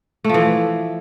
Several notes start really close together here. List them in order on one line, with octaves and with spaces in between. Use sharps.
A3 F3 E3